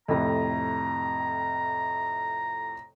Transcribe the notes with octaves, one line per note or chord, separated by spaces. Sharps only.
F2 A2 C3 A#5